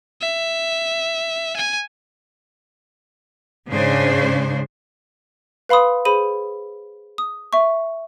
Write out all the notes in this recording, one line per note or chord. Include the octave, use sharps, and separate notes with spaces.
E5
G#5
G#2 C#3 D4 C5
B4 F5 B5 C6 D#6
G#4 C5 B5 D#7
D#6
E5 C#6